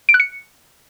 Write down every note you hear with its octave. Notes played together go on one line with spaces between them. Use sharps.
D7
F#6
C#7